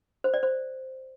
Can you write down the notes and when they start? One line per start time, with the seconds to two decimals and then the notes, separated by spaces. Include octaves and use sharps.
0.24 C5
0.34 D5
0.43 C5